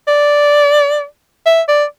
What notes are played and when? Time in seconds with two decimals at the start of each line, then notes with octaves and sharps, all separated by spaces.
0.07 D5
1.46 E5
1.68 D5